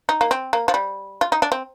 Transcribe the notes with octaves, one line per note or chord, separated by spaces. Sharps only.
D#4
A#3
C4
A#3
F3
G3
F4
D#4
D4
C4